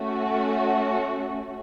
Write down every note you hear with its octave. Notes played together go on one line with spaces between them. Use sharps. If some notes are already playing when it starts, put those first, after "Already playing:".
Already playing: A3 C#4 F#4